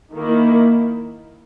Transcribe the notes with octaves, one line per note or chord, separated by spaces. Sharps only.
D#3 A#3 E4